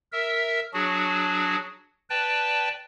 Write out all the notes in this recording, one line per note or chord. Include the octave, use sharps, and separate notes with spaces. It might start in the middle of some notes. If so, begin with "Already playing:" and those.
A#4 E5 E6
F#3 D4 F#4 G#4
B4 D5 G5 A5